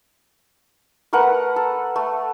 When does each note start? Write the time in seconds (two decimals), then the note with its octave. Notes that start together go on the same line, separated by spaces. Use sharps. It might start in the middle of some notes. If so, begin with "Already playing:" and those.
1.13 A3 A#4 B4 F#5
1.56 A4
1.96 A3